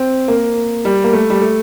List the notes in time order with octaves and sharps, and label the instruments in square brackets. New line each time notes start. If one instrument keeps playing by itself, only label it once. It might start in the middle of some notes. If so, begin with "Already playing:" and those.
Already playing: [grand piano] C4
A#3
G3
A#3
A3
G3
A3